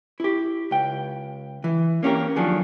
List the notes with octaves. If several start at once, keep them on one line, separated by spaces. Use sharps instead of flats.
E4 G4
C#2 G5
E3
A#3 C#4 G4 A#4
D#3 F3 F#3 D4 G#4 A4